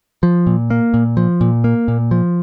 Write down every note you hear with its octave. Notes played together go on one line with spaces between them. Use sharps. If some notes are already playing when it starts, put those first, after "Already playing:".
F3
A#2
A#3
A#2
F3
A#2
A#3
A#2
F3